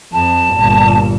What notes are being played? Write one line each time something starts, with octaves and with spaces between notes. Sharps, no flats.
F2 A5
G1 A#2